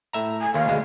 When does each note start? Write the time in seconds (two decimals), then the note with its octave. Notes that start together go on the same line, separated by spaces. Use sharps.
0.13 A2 E5 A#5
0.41 G#5
0.54 D#2 D#3 F5
0.66 D2 B2 G#3